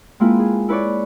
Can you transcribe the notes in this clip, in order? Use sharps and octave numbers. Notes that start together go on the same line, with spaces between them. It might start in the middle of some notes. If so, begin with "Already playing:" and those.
G#3 A#3 C4 E4 F4 B4
G#4
E4 B4 C#5 D5